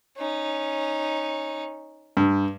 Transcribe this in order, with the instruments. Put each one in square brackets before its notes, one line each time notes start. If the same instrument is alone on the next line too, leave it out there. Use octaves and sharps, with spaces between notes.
[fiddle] C#4 D#4
[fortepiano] G2